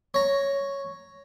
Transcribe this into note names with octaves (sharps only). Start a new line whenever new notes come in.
C#5 A#5